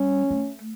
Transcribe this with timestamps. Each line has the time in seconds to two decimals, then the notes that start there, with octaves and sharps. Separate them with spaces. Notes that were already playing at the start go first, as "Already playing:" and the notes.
Already playing: G3 C#4
0.31 A3